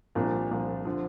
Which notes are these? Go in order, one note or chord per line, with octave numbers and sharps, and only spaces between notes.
C2 A#2 F3 D4
C2 A#2 F3
D3 F3